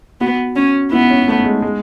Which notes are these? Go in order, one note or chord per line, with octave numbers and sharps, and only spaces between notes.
B3 F#4
C#4
B3 E4
C#4
A3
G#3
G#3